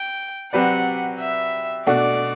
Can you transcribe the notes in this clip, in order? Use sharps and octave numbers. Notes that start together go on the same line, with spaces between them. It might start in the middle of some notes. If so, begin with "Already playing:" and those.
Already playing: G5
F#3 C4 G4 B4 D5 F#5
E5
B2 A3 D4 F#4 D5